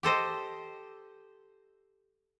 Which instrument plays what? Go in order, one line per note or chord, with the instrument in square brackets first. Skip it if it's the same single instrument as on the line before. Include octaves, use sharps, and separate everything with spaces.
[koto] G4 A4 C5 D#5